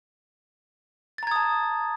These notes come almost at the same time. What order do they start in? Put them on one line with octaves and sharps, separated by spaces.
A6 A#5 G#6 D#6 A5